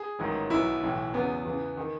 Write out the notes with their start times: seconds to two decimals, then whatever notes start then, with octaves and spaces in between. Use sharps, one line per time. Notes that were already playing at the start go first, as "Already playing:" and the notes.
Already playing: G#4
0.19 A1 G#2 D#3 F#3
0.50 B1 B2 F#3 E4
0.82 B1 A2 E3
1.14 E2 C#3 F#3 B3
1.45 E2 C#3 E3
1.77 D#3